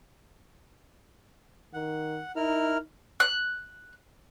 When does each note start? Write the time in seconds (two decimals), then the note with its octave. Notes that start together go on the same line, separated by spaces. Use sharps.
1.74 D#3 F#5
2.36 D#4 E4 A#4 F6
3.20 F#6